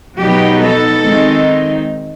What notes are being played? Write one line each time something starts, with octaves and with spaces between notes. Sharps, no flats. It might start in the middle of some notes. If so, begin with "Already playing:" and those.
B2 F#3 B3 D#4 G4
A4
D#3 G#3 C4 D#4